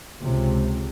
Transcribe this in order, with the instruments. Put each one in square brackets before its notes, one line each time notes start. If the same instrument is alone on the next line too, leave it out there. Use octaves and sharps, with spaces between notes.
[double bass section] C#2 C3